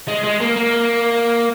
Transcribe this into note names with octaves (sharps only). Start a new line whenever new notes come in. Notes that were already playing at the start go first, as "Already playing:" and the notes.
G#3
G#3
A#3
A#3